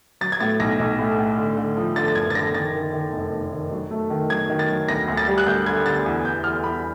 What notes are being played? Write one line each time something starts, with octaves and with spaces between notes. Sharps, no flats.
F#3 A6
G#6
A2 A6
B1 A#6
B1
A2
A2
D3
D3
F3
D3 A6
A6
F#1 G#6
A6
D3 A#6
D#3 A6
D#3
D#3
F1
F1
D#3
F#3
A3
D#3
F#3 G#6
D#3
A6
F#3
D2 A#6
D2
A6
G3
F#6
D2 G6
D3 G#6
D3 A6
E2
E2 G6
E2 F6
E2 B5